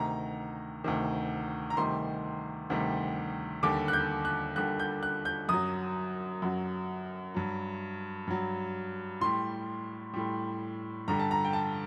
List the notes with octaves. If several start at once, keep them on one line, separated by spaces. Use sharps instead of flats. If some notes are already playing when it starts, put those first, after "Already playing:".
Already playing: D2 C3 D#3 A#5
D2 C3 D#3
A#5
D2 C3 D#3 G3 C6
D2 C3 D#3 G3
D#2 D3 G3 D6
F#6
G6
F#6
D#2 D3 G3 F#6
G6
F#6
G6
F#2 F#3 D#6
F#2 F#3
G2 F#3
G2 F#3
A2 G3 C6
A2 G3
G2 D3 G3 A#5
A5
A#5
G5
A5